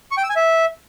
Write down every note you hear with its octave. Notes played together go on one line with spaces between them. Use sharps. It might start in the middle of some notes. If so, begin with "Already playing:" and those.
C#6
G5
E6
G#5
E5